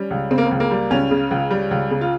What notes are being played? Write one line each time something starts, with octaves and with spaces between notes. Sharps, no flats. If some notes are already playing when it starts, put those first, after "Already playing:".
Already playing: G3 C#4
C#2
C#3 C4
A#3
C4
C#2
A#3
G3
C#2 C#4
C#3
C#2
G3
C#2
C#3
F4